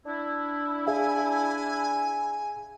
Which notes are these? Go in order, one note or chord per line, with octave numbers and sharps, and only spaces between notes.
D4 E4
G#4 E5 F5 G#5